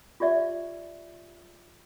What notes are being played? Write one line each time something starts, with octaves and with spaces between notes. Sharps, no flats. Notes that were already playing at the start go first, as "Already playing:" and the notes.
F4 G4 D5 E5